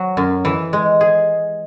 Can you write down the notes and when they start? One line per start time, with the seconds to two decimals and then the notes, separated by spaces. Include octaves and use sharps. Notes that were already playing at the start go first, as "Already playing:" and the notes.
Already playing: F#3
0.17 F#2
0.45 E3
0.73 G#3
1.01 G#4